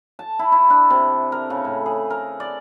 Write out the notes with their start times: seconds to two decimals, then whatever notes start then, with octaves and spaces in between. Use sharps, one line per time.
0.19 A5
0.39 E4
0.52 E4
0.70 D4
0.90 C3
1.32 A#4
1.50 C#3
1.65 A2
1.86 G#4
2.10 A#4
2.40 D5